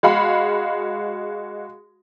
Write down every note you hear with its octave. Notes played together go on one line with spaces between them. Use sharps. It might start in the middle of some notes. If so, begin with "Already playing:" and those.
G#3 F#4 F5 B5